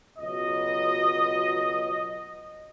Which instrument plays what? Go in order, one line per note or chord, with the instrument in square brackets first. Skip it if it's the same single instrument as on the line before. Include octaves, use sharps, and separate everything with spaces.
[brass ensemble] C#2 B2 F#3 D#5